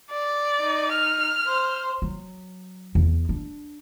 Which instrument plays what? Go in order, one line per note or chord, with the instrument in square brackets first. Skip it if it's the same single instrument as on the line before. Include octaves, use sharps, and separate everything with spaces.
[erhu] D5
[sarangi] D#4
[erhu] F6
[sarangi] C5
[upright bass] F#3
E2
D4